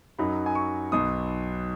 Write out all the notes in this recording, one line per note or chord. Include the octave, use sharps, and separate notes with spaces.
F#2 F#3 D#4 B5
G#5
C#6
B1 B2 F#3 D#6